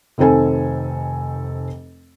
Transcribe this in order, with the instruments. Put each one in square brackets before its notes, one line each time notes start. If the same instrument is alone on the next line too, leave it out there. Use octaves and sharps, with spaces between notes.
[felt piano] F1 D#3 C4 A4 G#5